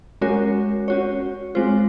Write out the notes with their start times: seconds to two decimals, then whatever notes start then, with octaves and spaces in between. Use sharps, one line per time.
0.21 G#3 C#4 F#4 A#4 C#5
0.88 C#4 F#4 C#5
1.55 G#3 C4 F4 C5